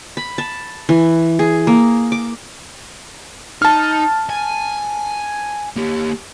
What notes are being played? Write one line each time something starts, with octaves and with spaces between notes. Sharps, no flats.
B5
A5
E3
G#4
A#3
D6
D#4 A5 F6
G#5
A#3 G4